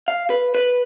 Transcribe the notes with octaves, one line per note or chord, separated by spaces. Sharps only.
F5
B4
B4